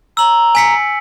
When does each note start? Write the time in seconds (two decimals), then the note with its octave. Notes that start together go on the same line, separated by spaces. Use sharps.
0.17 A#5 E6 F#7
0.55 G#5 B6 C#7